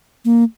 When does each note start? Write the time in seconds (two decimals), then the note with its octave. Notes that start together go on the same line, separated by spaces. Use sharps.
0.25 A#3